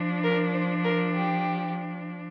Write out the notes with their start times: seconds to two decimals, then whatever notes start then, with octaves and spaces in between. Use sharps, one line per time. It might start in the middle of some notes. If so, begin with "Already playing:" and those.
Already playing: F3 D4
0.23 A#4
0.53 C5
0.84 A#4
1.15 G4